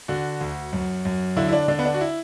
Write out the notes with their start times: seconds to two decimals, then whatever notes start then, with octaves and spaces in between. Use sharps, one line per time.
0.08 D3 F#4
0.41 D2
0.73 F#2
1.05 F#2
1.37 D3 E4
1.48 E4
1.53 D4
1.68 D3 D4
1.79 B3
1.85 D4
1.94 F#4
2.01 E4